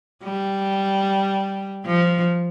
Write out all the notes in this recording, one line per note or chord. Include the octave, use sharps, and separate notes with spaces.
G3
F3